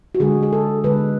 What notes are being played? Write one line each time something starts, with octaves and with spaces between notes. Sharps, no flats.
F#4
D3 G#3 G#4
G#4
A4
D3 G#3 B4